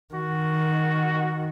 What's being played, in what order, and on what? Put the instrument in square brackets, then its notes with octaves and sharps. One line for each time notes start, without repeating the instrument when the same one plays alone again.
[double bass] D#3 [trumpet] F#4